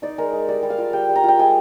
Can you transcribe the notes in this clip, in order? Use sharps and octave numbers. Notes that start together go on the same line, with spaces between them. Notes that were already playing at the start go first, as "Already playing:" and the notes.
D#4 D5
G#3 A#4
G#3
G3 D5
G3
F5
F4
G3 G5
G3
A#5
F4 G5
G#3 G#5